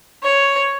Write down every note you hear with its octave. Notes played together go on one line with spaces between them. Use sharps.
C#5